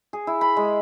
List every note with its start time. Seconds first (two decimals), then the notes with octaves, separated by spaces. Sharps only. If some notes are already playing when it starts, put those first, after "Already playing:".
0.13 G#4
0.27 E4
0.41 B5
0.57 G#3